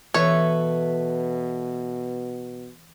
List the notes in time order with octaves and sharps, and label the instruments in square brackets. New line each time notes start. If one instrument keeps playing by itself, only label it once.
[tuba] B2 [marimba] E3 [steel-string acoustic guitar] A4 B4 E5 [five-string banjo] C#5